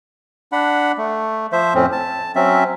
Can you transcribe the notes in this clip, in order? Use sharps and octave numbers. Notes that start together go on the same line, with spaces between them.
D4 F#5 B5
A3
F3 C5 E5
F2 A2 C4 C#4
A5
F#3 C4 C#4 E5